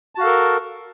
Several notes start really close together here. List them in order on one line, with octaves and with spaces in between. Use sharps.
A5 F#4 F5 A4 A#4